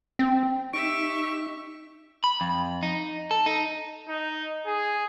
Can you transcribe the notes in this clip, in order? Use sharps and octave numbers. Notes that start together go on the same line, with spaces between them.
C4
D#4 G4 E5 C#6 D7
B5
F2
D#4
A4
D#4
D#4
G#4